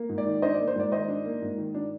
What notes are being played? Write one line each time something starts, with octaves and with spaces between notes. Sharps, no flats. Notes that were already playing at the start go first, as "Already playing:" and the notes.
Already playing: A#3
G#2
D5
D#3
D4 C5 D#5
A#3 D5
C5
G#2 D5
D#3 C5 D#5
D4
A#3
G#2
D#3
D4